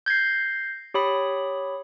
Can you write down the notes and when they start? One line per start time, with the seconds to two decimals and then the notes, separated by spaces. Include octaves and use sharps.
0.06 G6 G#6 A#6 C7
0.94 G4 C#5 B5 D#6